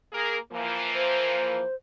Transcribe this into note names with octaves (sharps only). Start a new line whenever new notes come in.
A#3 G#4 A#4
E3 F3 A#3
C5